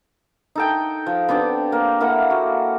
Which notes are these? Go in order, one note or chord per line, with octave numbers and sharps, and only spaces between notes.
D#4 A4 G5
F3
B3 C4 D4 G4
A#3
A#3 E4 A4 F#5
F#4